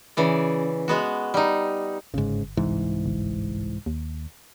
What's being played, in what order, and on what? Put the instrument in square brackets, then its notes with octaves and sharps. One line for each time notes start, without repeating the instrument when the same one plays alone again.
[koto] C#3 E3 D5
G#3 B3 F#4
G3 D#4
[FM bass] G1 [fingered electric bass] G#2 C#3
[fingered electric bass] C2 G#2 E3
[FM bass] G1
D#2